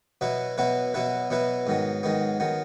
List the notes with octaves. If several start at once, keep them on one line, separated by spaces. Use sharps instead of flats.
B2 F#3 B3 E4 B4
B2 F#3 B3 E4 B4
B2 F#3 B3 E4 B4
B2 F#3 B3 E4 B4
G#2 D#3 F#3 B3
G#2 D#3 F#3 B3
D#3 F#3 B3